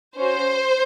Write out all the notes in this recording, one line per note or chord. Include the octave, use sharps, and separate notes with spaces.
C#4 F#4 C5